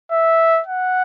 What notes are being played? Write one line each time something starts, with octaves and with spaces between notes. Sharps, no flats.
E5
F#5